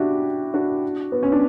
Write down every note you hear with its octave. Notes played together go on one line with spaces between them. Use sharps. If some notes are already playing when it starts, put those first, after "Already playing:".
Already playing: D4 E4 F#4 G4
D4 F#4
B3
C#4
D4